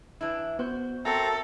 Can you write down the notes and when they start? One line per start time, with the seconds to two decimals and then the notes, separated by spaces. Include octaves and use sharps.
0.21 E3 D4 E4
0.59 B3 F#4 C5 G6
1.05 C4 F#4 A4 A#4 E5 A#5